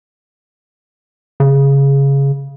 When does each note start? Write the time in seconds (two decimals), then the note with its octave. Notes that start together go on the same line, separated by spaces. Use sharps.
1.40 C#3